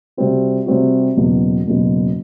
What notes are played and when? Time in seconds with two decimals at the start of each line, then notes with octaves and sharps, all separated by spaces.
0.17 C3 G3 C4 F#4
0.66 C3 G3 C4 F#4
1.16 F#1 E2 B2
1.67 F#1 E2 B2